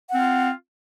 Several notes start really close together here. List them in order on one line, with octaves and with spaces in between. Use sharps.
F#5 C4 F4